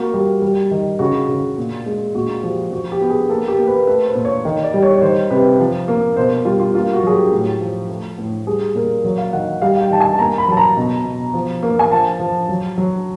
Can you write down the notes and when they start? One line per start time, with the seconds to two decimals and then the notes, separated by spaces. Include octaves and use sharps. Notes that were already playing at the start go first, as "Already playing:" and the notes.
Already playing: A#3 F#4
0.14 G3
0.42 G3
0.71 D#3
0.99 C#3 F#4
1.29 C#3
1.58 A#2
1.86 G#3
2.15 A#2 F#4
2.43 F3 G4
2.71 F3 F#4
2.92 G4
3.01 B3
3.10 G#4
3.29 A#3 A4
3.48 G4
3.58 A#3
3.67 B4
3.87 A3 B4
4.06 C5
4.15 A#2
4.25 C#5
4.45 D#3
4.63 D5
4.74 G3
4.83 C#5
4.96 C#5
5.02 D#3 C5
5.31 C3 B4
5.60 F3
5.88 A#3
6.17 B2 C5
6.45 G3 F4
6.60 F4
6.74 A#3 F4
6.93 F#4
7.03 F#3 G#4
7.12 G4
7.32 A2
7.61 F3
7.89 A3
8.18 A2
8.46 G3 G#4
8.75 A#2 A#4
9.04 F#3
9.18 F5
9.33 D#3 F#5
9.62 G3 F5
9.81 G5
9.90 D#3 A5
10.00 G#5
10.13 A5
10.19 A#3 A#5
10.38 B5
10.48 F#3 A5
10.57 A#5
10.77 B2
11.05 B2
11.34 F3
11.63 A#3
11.79 G#5
11.91 F3 A5
12.20 F3
12.49 F#3
12.77 F#3